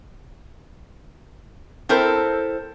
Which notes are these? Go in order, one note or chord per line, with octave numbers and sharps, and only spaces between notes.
C4 E4 A4 A#4 C5